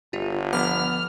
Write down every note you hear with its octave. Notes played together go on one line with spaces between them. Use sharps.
G1 F4 G4
F3 B3 D6 F6